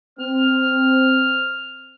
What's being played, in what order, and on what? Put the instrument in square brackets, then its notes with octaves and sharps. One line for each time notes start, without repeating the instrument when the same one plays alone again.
[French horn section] C4 [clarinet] F6